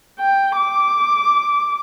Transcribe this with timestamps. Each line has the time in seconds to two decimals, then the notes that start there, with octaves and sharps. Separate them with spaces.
0.19 G5
0.56 D6